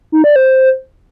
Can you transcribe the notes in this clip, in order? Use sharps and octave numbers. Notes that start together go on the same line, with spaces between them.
D#4
D5
C5